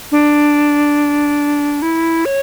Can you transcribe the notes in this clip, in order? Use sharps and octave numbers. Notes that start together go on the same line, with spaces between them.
D4
E4
C#5